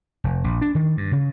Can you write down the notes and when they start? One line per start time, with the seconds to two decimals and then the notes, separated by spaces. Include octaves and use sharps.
0.24 F1
0.44 A#1
0.61 D4
0.75 D#3
0.97 G2
1.12 C#3